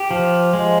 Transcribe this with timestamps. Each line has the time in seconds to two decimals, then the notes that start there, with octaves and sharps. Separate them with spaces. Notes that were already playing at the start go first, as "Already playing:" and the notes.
Already playing: G4
0.11 F3
0.53 G#3